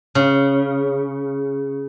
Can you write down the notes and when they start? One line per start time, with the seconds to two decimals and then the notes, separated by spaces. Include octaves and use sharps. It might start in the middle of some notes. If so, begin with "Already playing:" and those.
0.15 C#3